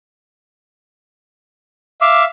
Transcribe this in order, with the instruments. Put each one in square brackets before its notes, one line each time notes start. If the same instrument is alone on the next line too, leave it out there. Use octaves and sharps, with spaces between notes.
[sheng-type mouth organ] E5 F5 [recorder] D6